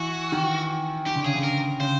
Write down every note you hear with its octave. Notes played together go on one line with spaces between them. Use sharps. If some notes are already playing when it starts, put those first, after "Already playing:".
Already playing: E3 F#4
D#3
D#3 G4
D3
C#3 G#4
D3
A#4
C#3 C5